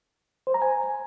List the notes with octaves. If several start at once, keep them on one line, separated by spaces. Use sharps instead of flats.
C5
A#5
G#5